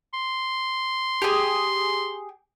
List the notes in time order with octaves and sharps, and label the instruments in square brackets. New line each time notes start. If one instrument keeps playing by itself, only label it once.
[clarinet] C6
[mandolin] G4 G#4